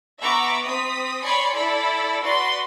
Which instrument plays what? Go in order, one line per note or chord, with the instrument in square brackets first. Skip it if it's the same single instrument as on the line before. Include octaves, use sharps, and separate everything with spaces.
[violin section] B3 E5 A#5 B5 C#6 D6
C4 D#6 B6
C#5 D5 G#5 B5 C6 C#7
E4 A4 D5 B5
F#4 B4 D5 C6